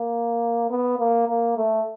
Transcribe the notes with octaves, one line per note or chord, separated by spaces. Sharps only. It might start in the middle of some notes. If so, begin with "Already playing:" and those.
Already playing: A#3
B3
A#3
A#3
A3